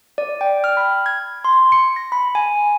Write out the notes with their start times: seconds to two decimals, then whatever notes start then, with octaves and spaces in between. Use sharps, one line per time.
0.18 D5
0.41 G5
0.64 F6
0.77 B5
1.06 G#6
1.45 C6
1.72 C#7
1.96 A#6
2.12 B5
2.35 G#5